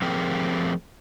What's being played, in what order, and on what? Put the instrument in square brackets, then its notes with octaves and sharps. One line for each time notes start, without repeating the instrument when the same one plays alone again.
[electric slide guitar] F3 A3 C4 G4 G#4 A#4